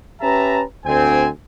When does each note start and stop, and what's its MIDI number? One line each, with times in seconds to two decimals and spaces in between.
0.21 0.62 61
0.21 0.62 67
0.21 0.62 71
0.21 0.62 76
0.21 0.62 81
0.21 0.62 82
0.85 1.28 38
0.85 1.28 60
0.85 1.28 80